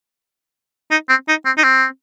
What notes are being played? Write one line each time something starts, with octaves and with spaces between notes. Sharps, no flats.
D#4
C4
D#4
C4
D#4
C4